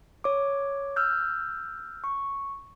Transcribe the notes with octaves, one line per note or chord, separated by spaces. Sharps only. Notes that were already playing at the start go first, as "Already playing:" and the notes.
C#5 D6
E6 F6 G6
C#6